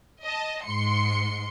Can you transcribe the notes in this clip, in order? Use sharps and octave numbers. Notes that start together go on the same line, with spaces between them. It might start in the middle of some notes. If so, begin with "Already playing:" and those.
D#5 A5
G#2 C6 C#7